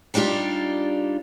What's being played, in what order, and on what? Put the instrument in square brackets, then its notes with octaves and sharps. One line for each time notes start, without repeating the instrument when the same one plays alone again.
[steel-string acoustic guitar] G3 D4 D#4 F4 G4